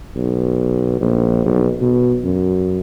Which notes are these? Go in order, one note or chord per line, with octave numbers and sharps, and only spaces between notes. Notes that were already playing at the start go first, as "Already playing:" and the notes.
B1
A#1
B1
B2
F#2